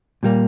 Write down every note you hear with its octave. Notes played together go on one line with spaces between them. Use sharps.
A#2 G3 A#3